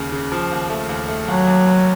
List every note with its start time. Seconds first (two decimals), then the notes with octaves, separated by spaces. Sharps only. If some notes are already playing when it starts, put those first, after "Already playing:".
Already playing: D#2 C#3
0.12 C#3
0.32 F3
0.51 D#2
0.70 A3
0.89 D#2
1.09 A3
1.28 D#2 F#3
1.47 D#2
1.66 F1